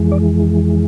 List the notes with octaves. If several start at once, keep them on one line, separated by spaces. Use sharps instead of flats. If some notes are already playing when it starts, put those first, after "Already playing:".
Already playing: F2 E3 G#3
D5